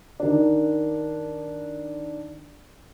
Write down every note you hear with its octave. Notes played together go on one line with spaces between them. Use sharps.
D#3 D4